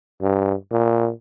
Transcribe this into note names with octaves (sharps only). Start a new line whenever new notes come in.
G2
A#2